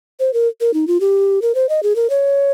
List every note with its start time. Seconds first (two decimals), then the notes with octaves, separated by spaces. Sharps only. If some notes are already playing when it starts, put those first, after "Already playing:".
0.20 C5
0.34 A#4
0.61 A#4
0.74 D#4
0.88 F4
1.00 G4
1.42 A#4
1.55 C5
1.69 D#5
1.83 G#4
1.96 A#4
2.10 C#5